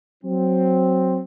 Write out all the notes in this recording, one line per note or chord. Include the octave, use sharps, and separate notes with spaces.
F#3 C4